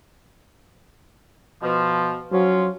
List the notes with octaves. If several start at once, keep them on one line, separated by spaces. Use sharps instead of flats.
B2 F3
F3 F#3 C#4 F4